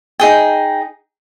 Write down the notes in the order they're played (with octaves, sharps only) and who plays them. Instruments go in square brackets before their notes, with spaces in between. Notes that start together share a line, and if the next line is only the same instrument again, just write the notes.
[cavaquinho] D#4 G#4 G5